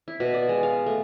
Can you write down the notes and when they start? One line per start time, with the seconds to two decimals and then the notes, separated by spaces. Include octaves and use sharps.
0.08 E4
0.20 B2
0.34 D5
0.49 G#3
0.63 F5
0.86 A3